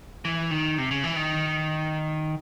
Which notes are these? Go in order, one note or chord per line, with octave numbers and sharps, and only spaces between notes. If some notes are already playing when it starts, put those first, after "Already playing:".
E3
D#3
C3
C#3
E3
D#3